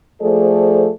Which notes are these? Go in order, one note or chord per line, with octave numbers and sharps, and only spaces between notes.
F3 A3 G#4 A4 C5 D5